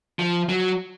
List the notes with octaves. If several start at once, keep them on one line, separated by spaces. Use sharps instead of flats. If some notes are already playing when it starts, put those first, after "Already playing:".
F3
F#3